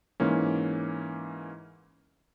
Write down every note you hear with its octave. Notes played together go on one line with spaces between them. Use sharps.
G#2 E3 A#3 C#4